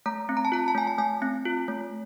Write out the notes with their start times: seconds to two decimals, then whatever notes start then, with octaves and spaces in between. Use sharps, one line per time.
0.06 A3 A#5
0.29 C4
0.37 A#5
0.45 A5
0.52 F4 A#5
0.68 A5
0.75 A3 G#5
0.87 A5
0.98 A3 G#5
1.22 C4
1.45 F4
1.68 A3